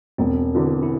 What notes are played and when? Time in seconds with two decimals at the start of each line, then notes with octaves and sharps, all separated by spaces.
0.18 E1 C4
0.55 E2 D3
0.83 E4